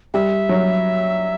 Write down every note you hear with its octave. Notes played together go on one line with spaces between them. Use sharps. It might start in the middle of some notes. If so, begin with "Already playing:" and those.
G3 E5
F#3